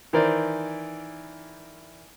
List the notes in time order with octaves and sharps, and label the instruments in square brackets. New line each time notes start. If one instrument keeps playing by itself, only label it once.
[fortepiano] D#3 E3 E4 A#4 C5 D5